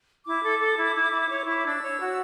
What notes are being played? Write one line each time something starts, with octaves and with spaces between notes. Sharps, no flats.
E4 D6
A4
A4
E4
E4
E4
C#5
E4 C#6
D6
D4 E6
C#5
F#4